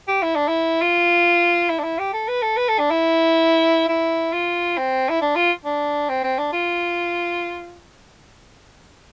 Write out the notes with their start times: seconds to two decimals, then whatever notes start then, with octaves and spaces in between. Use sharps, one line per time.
0.08 G4
0.23 E4
0.36 D4
0.48 E4
0.82 F4
1.69 E4
1.79 D4
1.84 E4
1.99 G4
2.13 A4
2.28 B4
2.42 A4
2.57 B4
2.69 A4
2.79 D4
2.91 E4
3.89 E4
4.33 F4
4.77 C4
5.09 E4
5.22 D4
5.36 F4
5.65 D4
6.09 C4
6.24 C4
6.38 D4
6.53 F4